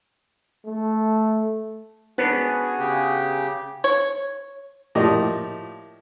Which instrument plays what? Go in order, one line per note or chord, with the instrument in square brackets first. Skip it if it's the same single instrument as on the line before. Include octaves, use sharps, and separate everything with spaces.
[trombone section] A3
[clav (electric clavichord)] B3 C#4 D4 [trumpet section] F#4 G#4 G#5 [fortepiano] B4
[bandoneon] C#3 G4
[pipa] C#5
[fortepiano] A2 F3 A#3 G4 D5 D#5